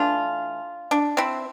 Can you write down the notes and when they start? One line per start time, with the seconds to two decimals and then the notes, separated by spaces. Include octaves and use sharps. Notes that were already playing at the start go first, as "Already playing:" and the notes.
Already playing: E3 A3 D4 F4
0.91 D4
1.17 C4 E4